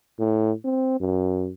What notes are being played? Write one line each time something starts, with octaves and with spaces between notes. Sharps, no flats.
A2
C4
F#2